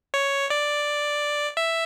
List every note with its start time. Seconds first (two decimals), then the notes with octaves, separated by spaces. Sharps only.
0.14 C#5
0.50 D5
1.57 E5